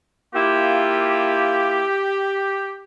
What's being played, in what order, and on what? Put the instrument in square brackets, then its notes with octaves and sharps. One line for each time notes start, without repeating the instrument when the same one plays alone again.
[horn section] A#3 E4 F4 [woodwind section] G4